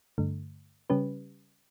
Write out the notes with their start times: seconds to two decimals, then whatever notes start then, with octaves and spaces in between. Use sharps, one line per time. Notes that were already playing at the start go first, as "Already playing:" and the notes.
0.18 G2 D3 A3
0.90 C#3 G3 C#4 G4 B4